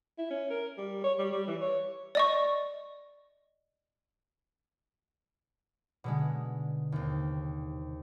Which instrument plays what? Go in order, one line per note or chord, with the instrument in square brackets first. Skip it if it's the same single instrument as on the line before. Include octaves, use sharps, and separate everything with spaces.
[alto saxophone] E4
C#4
A#4
G3
C#5
G3
G3
E3
C#5
[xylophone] D5 D#5 C#6
[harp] B2 D3 G#3
D#2 C3